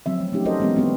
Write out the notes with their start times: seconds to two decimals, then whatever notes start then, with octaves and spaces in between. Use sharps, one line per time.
0.06 F3 F#3 C4 E5
0.21 A3
0.33 A3 C#4 D#4 G4
0.45 F#4 A4 A#4 C5 D#5
0.60 E3 G#3 B3 C4 A#4
0.76 B3 C4 D4 F#4